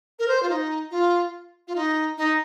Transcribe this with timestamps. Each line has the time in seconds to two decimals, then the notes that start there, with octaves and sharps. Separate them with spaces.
0.19 A#4
0.28 C5
0.43 F4
0.50 D#4
0.91 F4
1.67 F4
1.76 D#4
2.17 D#4